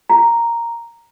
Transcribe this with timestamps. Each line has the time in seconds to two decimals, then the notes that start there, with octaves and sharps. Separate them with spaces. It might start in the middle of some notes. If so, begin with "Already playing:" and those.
0.10 A#5